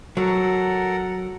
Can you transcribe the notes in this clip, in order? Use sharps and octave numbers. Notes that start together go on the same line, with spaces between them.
F#3 A4 A#4 F#5